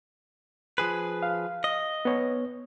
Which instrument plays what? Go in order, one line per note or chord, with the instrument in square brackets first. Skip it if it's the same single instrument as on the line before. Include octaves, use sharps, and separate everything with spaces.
[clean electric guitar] F3 G#4 B4
[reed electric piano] F5
[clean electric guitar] D#5
[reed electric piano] B3 C#5